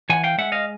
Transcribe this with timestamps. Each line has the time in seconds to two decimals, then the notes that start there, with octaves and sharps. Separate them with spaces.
0.10 E3 F#5 G#5
0.24 F5 G5
0.38 G#3 E5 F#5
0.52 D#5 F5